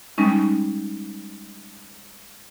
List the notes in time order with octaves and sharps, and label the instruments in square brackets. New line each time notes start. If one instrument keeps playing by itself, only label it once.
[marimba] G3 G#3 C#4 D#4